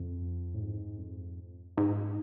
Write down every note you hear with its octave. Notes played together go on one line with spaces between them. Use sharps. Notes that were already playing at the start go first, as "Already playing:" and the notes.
Already playing: F2
A2
G#2
F2
G#2